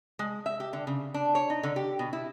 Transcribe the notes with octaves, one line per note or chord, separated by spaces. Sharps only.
G#3
E5
G4
D3
C#3
D4
C#5
D#4
D3
G4
B2
E4